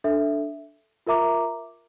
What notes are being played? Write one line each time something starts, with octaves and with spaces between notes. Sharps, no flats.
D4 A4 E5
F4 A#4 E5 A#5 D6